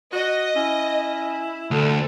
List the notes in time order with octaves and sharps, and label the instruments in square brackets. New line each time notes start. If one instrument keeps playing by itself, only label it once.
[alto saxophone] F#4 [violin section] D#5
[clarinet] C#4 [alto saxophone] E4
[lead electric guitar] D2 [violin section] A4